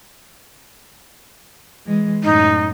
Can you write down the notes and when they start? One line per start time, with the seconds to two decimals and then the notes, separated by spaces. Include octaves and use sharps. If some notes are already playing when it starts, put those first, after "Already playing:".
1.86 E3 G#3
2.24 F#2 A2 D#4